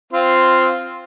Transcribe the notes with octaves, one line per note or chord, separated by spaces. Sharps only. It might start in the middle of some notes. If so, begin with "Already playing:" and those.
C4 F4